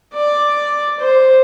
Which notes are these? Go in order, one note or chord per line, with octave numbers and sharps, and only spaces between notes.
D5
C5